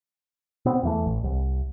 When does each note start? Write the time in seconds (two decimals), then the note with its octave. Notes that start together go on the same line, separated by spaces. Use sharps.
0.65 B2 B3 C4
0.83 E2 E3 A3
1.06 A1
1.23 C2